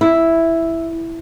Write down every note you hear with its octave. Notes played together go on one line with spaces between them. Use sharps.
E4